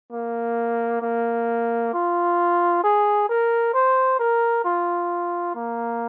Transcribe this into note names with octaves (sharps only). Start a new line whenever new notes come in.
A#3
A#3
F4
G#4
A#4
C5
A#4
F4
A#3